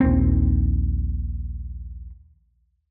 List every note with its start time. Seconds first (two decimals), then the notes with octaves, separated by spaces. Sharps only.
0.01 A#1 D#2 C4